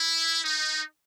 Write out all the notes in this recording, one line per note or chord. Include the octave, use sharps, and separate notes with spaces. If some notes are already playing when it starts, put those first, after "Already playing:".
Already playing: E4
D#4